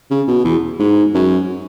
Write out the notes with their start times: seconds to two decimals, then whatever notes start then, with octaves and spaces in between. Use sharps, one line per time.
0.11 C#3
0.28 B2
0.45 E2
0.80 G#2
1.15 F#2